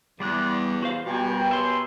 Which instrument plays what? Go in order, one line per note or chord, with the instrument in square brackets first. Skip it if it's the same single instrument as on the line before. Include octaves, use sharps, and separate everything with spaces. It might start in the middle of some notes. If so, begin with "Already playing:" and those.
[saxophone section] E2 [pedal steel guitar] G3 D5 F#6
[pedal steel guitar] F#4 C5 F5
[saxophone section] B2 [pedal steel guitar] G3 G#5 [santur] F4 G4 A#5
[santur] A#3 C5 G5
[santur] C#5 G#5 [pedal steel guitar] E5 C6